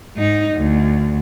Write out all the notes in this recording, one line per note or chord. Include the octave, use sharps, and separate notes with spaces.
G#2 D#4
D2